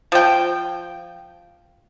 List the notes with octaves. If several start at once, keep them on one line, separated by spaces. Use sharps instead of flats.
F3 G5